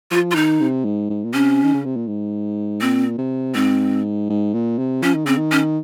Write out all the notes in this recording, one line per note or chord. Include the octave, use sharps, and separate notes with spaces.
F3 F4
F4
D#3 D#4
C3
G#2
G#2
A#2
C3 C#4
D#3
C#3
C3
A#2
G#2
A#2 C4
C3
G#2 C4
G#2
A#2
C3
F3 C#4
D#3
C#3 C4
D#3
C#4